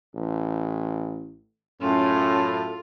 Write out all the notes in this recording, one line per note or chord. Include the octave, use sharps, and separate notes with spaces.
A1
F#2 A2 C#4 F4 A4